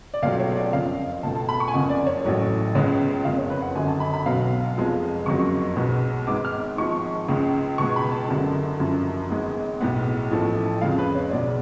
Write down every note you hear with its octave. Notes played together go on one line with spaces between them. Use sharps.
D5
C#2 B2 F#3 A3 F5
C#5
D5
F#1 F2 C#3 F5
C#2 B2 A3 A5
A5
B5
C#6
G#5
F#1 F2 C#3 F#5
D5
C#5
A1 A2 F#3 A3
C#2 C#3 G#3 B3 C#5
F#1 F2 C#3 F5
C#5
B4
F#5
G#1 F#2 D3 G#5
A5
B5
B5
B1 B2 F#3 B3 F5
F1 F2 F3 G#3
F#1 F2 C#3 F#3 C#6
B1 B2 G#3 B3
G#1 G#2 G#3 B3 D6
F6
G#1 G#2 F3 G#3 C#6
C#2 C#3 G#3
C#2 B2 G#3 B3 C#6
B5
A5
F#1 F#2 D3
F#1 F#2 F3
G#1 G#2 G#3 B3
B1 A2 G#3 B3
A1 A2 F3 A3
F2 C#3 G#3 F5
B4
C#5
B1 B2 G#3 B3 D5